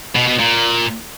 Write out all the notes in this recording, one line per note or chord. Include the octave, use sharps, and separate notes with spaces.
B2
B2
A#2